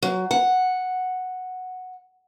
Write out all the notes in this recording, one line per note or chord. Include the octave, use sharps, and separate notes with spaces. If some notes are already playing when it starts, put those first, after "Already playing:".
F#3
F#5